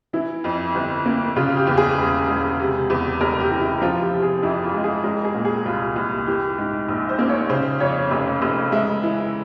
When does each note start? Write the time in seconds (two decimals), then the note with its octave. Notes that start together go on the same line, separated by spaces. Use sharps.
0.13 E3 E4
0.44 F2
0.75 G1
1.06 A#3
1.36 C#3 F4
1.57 G4
1.67 E2
1.77 G#4
1.98 E1
2.28 E1
2.59 C3
2.90 E2
3.20 F1 A#4
3.40 G4
3.51 E3
3.61 E4
3.82 F3 F4
4.01 G4
4.12 C3
4.22 G#4
4.43 F2 E4
4.63 F4
4.74 G#3
4.84 G#4
5.04 G#3 A#4
5.25 G#4
5.35 A#2
5.45 G#4
5.66 C2 F4
5.96 C2
6.27 E3 G4
6.58 G#2
6.88 A#1
7.09 C5
7.19 A#3
7.29 C#5
7.49 C#3 C5
7.80 F2 C#5
8.11 F1
8.42 F1
8.72 G#3 E5
9.03 E3